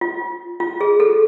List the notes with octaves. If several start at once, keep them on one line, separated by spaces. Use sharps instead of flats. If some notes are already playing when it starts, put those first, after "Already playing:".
F4
F4
G#4
A4